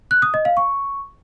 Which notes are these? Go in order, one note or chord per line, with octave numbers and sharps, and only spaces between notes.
F#6
D#6
D#5
F5
C#6